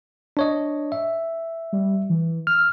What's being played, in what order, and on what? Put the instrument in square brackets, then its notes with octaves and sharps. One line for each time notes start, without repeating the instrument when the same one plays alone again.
[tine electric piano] D4 C#5 D#5
E5
[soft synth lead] G3
E3
[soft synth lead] E6 [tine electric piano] F6